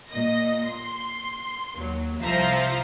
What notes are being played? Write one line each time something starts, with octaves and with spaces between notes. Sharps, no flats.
A#2 D#5 A#6
C6
D#2 F#3
C2 F3 C5 E5 F5 A#5